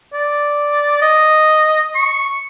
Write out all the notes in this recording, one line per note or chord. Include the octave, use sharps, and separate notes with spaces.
D5
D#5
C#6